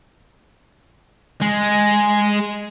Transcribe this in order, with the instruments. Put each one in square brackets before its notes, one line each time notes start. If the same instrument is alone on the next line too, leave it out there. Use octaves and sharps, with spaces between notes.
[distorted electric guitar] G#3